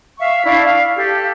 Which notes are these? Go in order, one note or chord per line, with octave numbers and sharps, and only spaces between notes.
E5 F5 C#6
D4 E4 F5 C#6
F5
G4 A4